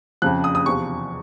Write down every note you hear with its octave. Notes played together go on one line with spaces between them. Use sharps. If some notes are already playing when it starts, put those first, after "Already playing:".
F2 C#3 F3 F#6
D#6
D#6
E2 C3 F3 C#6